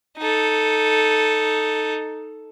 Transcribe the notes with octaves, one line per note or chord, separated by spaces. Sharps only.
D#4 A4